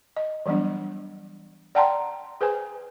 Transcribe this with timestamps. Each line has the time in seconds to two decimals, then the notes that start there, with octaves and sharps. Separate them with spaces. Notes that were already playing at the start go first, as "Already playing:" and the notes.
0.17 D#5
0.46 E3 F#3 G3 B3 D4
1.75 D5 F#5 G5 A5 A#5 C6
2.41 G#4 B4 C5 G#5